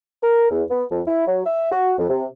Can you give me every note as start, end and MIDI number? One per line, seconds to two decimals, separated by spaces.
0.22 0.50 70
0.51 0.63 40
0.70 0.83 59
0.91 1.02 41
1.07 1.24 64
1.27 1.41 54
1.46 1.70 76
1.72 1.92 66
1.98 2.08 41
2.10 2.26 48